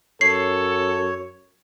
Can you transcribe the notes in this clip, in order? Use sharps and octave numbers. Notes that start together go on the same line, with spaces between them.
F#2 A4 C#5 C7